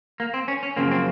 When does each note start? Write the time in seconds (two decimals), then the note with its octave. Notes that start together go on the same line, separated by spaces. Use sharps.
0.20 A#3
0.34 C4
0.48 C#4
0.63 C#4
0.76 F#2 C#3 F3 A#3 C4
0.92 C4